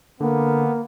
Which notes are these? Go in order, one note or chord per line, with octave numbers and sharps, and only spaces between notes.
D3 A#3 B3